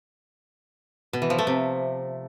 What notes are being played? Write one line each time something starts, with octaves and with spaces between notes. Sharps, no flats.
B2
E3
F3
A3
C3